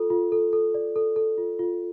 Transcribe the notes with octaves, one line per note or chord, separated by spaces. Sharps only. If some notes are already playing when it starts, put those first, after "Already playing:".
Already playing: F4 A4
F4
A4
A4
D5
A4
A4
F4
F4